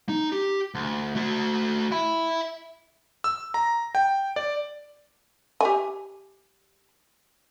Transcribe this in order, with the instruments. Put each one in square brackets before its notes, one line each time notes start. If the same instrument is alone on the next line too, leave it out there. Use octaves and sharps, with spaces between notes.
[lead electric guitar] D#4
G4
D2
A3 F#4
E5 B5
[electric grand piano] E6
A#5
G5
D5
[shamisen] G4 G#5